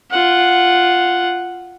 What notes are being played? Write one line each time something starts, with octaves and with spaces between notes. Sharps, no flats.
F4 F#5